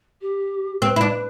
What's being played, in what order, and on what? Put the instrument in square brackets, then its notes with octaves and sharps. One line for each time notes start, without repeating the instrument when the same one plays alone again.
[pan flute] G4
[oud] C4 [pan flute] B4
[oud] E4
D4